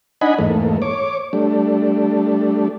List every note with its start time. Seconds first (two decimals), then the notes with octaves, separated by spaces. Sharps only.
0.21 D4 D#4 D#5 F#5 G#5 B5
0.38 E2 G#2 A3 A#3
0.82 C#5 D6
1.33 G3 A3 D4